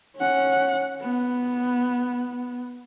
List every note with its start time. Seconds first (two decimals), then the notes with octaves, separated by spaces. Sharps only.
0.16 C#4 F#5
1.00 B3